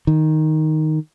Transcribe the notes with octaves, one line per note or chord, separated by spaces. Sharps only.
D#3